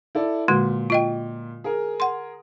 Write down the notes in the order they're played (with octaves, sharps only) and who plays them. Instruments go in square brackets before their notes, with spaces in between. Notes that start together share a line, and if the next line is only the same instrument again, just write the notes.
[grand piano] E4 A4 D5
[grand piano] A#2 [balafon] D3 G#3 F#4
[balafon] F4 D#5 G5
[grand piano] G#4 A#4
[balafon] F#5 C6